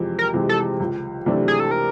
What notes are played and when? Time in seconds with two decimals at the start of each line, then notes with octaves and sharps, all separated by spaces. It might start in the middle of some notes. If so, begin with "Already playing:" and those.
Already playing: F2 C3 E3 G#3
0.19 A#4
0.34 C3 E3 G#3
0.49 A4
0.80 C#2
1.26 C3 E3 A3 D4
1.48 G#4
1.60 A4
1.71 A#4